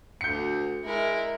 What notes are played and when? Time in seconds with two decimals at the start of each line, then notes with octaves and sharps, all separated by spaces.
0.21 D2 G6 C#7
0.84 G#3 E4 A#4